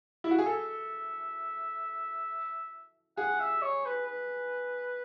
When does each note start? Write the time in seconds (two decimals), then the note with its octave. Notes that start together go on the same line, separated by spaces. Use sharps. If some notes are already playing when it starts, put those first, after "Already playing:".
0.24 E4
0.31 F#4
0.38 G#4
0.46 A4 E5
3.17 G#4 F#5
3.40 E5
3.62 C#5
3.85 B4
4.07 B4